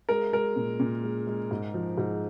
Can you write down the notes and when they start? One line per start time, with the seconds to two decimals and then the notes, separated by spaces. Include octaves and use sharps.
0.09 G#3 A#4
0.33 G#3 A#4
0.56 A#2
0.80 A#2
1.04 G#3
1.27 G#3
1.51 G#2
1.74 F3
1.98 G#2